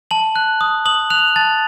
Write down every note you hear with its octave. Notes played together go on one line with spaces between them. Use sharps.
A5 F#7
F#6
D#6
D#6 F#7
F#6 F7
A5 A6